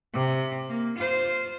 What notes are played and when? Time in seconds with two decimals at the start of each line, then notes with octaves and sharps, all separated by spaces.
0.14 C3
0.69 A#3
0.98 F4 C5